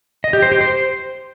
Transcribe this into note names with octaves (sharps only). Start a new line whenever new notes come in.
D#5
G4
C5
G4
C5